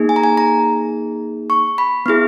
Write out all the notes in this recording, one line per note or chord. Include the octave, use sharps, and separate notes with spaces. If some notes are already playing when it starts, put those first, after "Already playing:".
Already playing: A#3 D#4 G#4
G#5
A#5
G#5
A#5
C#6
B5
B3 E4 G#4